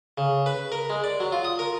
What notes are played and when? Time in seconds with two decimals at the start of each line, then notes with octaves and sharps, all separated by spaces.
0.18 C#3
0.46 B4
0.72 A#4
0.90 G#3
1.04 D5
1.20 F#3
1.32 F4
1.45 D#6
1.59 A#4